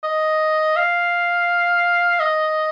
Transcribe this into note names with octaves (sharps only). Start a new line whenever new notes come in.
D#5
F5
D#5